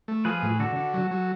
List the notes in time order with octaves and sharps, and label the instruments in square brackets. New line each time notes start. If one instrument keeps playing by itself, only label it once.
[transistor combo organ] A3
[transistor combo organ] F3 [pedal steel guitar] G#4 B4
[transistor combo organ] A2
[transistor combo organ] D3 [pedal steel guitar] F#4 A4
[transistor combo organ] D3
F#3
F#3